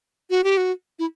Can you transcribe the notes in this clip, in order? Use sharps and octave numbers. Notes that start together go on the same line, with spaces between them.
F#4
G4
F#4
E4